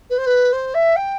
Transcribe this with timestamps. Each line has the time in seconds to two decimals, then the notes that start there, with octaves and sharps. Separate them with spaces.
0.10 B4
0.18 C5
0.26 B4
0.53 C5
0.74 E5
0.96 G5